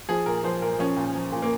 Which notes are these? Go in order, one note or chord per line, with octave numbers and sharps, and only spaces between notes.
F3 G#4
A#2 A#4
F3 C5
A#2 A#4
F3 C#4
A#2
F3
A#2
A#3